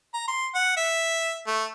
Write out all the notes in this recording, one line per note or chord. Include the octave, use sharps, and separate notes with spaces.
A#5
C6
F#5
E5
A3